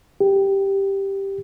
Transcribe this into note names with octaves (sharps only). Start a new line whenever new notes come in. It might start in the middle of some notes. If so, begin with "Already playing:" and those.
G4